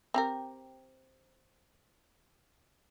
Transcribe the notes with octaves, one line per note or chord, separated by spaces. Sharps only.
C4 G4 A#4